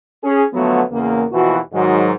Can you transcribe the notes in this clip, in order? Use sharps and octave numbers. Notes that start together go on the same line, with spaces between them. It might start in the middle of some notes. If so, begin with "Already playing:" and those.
C#4 G#4
D3 F3 F#3 A3 B3
E2 C#3 A#3
D#2 B2 E3 F3 F#4
G#2 D#3 F#3